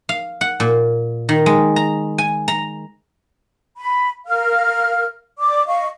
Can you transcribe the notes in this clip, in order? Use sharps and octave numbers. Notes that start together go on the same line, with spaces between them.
F5
F#5
A#2
D#3
G#3
A#5
G#5
A#5
B5
A#4 F5 F6
D5 D6
D#5 F5 C#6